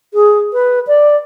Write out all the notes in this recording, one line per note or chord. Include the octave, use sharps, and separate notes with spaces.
G#4
B4
D5